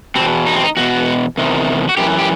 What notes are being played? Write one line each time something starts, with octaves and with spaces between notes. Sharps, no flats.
E2 B2 C4
D#4
C4
D#4
E2 B2 F#4
E2 C3 D#3
F#4
F#2 E3 G4
G4